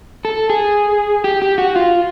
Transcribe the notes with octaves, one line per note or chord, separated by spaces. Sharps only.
A4
G#4
G4
G4
F#4
F4